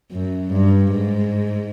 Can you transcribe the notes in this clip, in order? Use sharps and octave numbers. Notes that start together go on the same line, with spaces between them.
F#2
G2
G#2